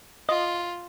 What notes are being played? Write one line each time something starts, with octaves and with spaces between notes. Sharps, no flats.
F4 D#5